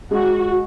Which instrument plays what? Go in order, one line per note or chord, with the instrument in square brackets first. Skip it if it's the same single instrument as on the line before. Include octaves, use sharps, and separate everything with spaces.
[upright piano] G#3 [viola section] F#4